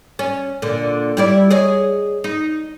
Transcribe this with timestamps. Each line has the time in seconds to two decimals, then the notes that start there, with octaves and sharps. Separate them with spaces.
0.19 C#4
0.62 A#2 D3
1.17 G3 E4 D5
1.50 G#4 C#5 D#5
2.24 D#4